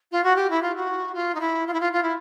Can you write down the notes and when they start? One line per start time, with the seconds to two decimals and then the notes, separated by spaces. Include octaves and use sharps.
0.12 F4
0.24 F#4
0.36 G4
0.50 E4
0.62 F4
0.76 F#4
1.15 F4
1.35 D#4
1.41 E4
1.67 F4
1.74 E4
1.80 F4
1.93 F4
2.03 E4